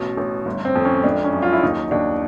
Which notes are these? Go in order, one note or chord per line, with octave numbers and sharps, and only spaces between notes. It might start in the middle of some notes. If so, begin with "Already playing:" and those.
Already playing: A1 B2
A1
G1
C4
F2
C#4
G#1 D4
C#4
F#2
F4
E4
D#2 D#4
D#2 D4